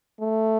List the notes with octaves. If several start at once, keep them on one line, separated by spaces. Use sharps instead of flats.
A3